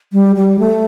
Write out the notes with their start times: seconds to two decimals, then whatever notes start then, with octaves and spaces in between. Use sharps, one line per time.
0.13 G3
0.36 G3
0.59 A3